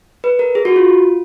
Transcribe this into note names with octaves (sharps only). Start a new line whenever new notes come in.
B4
A#4
G#4
F#4
F4